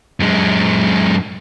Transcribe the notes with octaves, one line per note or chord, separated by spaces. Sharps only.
F#2 G#3